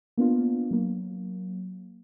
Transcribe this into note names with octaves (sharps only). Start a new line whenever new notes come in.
A#3 B3 D4 F4
F#3 A#3